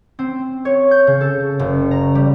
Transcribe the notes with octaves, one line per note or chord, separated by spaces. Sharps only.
C4
C#5
G6
C#3
A4
F#1
A#5
G3